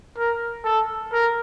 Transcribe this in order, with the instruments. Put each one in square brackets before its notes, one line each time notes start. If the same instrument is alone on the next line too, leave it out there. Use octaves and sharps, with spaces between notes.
[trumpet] A#4
A4
A#4